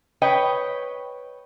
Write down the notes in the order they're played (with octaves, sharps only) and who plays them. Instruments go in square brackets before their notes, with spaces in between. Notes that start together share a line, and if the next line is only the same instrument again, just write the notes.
[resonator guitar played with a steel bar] B4 C#5 D#5 G5